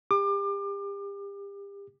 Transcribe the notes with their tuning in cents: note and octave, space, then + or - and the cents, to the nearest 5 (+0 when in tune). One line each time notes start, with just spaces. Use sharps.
G4 +35 D6 +30